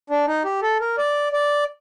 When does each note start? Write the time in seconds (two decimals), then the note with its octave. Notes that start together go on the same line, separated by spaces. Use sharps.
0.10 D4
0.27 D#4
0.45 G4
0.62 A4
0.80 A#4
0.98 D5
1.32 D5